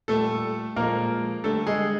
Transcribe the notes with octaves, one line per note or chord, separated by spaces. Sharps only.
A#2 G3 A3 A4
A#2 F3 G#3 A#3 A#4
D3 G3 A3 A4
G#3 G#4